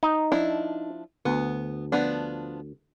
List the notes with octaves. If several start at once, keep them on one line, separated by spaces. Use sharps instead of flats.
D#4
F3 D4 E4
D2 B3
F3 B3 D4